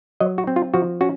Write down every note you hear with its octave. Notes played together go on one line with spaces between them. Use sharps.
F#3 D#5
F#4
C4
F4
F3 F#4
C#4 F#4